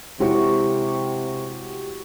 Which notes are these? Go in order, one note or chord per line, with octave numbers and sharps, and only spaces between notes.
C3 G#3 E4 F#4 G4 C#5 G5